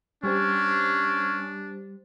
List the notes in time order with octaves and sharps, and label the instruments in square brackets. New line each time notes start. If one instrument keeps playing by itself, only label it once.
[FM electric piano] G3 G4 C5 [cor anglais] C#4 [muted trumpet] D4